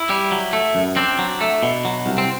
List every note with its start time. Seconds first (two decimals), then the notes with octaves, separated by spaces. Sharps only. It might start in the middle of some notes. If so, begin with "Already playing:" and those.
Already playing: E4
0.10 G3
0.32 F#3
0.53 A3
0.75 F#2
0.96 C4 D4
1.19 F#3
1.41 A3
1.63 B2
1.85 F#3
2.06 C2
2.18 C4